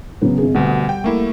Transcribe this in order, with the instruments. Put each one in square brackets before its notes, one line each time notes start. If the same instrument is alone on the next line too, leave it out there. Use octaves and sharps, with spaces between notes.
[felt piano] C#3 F#3 B3
G#1 G#4
[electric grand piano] D2 B2 [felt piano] G3 F#5
[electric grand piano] G5
A3 A#3 E4